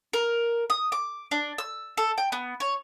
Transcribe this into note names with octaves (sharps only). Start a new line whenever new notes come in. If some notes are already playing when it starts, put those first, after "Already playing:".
A#4
D#6
D6
D4
E6
A4
G5
B3
C#5